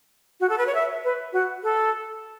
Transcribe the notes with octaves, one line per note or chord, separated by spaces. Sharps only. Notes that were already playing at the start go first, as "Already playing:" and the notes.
F#4
A4
B4
C#5
E5
B4
F#4
A4